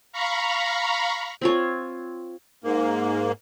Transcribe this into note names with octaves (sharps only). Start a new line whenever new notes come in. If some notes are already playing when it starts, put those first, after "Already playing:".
F5 A#5 B5 C#6
C4 F4 C#5
G#2 A#3